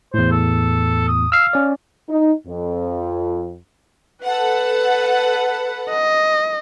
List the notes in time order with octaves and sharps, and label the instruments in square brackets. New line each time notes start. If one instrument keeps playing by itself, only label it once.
[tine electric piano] E2 A2 [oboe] C5
[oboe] A4
D#6
[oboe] F5 [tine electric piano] E6 F6 C7
[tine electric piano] C#4 D5
[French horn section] D#4
F2
[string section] A4 F#5 [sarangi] B4
[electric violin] D#5